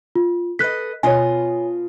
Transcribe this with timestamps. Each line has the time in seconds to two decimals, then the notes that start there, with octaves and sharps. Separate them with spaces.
0.16 F4
0.59 A4 B4 D#5 F#6 B6
1.03 B2 F4 C#5 D#5 G#5